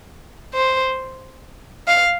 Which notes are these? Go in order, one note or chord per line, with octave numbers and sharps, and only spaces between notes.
C5
F5